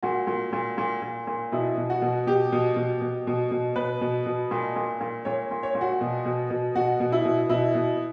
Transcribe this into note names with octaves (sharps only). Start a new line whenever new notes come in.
A#2 F#4
A#2
A#2
A#2
A#2
A#2
B2 E4
B2
F#4
B2
B2 G4
B2
B2
B2
B2
B2
B2 B4
B2
B2
A#2
A#2
A#2
A#2 C#5
A#2
C#5
A#2
F#4
B2
B2
B2
B2 F#4
B2
E4
B2
B2 E4
B2